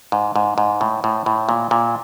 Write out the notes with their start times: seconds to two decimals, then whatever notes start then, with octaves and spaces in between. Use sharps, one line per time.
0.12 G#2
0.36 G#2
0.58 G#2
0.81 A2
1.04 A2
1.26 A2
1.49 A#2
1.71 A#2